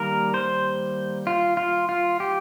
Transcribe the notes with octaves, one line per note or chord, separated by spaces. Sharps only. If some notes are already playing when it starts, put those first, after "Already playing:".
Already playing: D#3 G3 A#3 A#4
C5
F4
F4
F4
G4